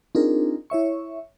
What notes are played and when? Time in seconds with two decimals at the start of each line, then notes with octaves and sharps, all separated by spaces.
0.15 C4 D4 D#4 F4 G#4 A#4
0.70 E4 C#5 E5 C#6